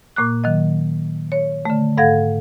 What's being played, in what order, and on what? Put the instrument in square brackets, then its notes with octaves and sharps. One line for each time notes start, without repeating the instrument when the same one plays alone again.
[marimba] A#2 A#3 D6 F#6
D#3 F#3 D#5
C#5
D3 A3
G#2 A4 F5 F#5 G#6 A#6